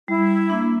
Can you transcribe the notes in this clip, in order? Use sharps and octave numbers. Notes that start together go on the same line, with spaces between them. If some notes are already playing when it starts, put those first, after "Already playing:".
G3 E4
A#3 D4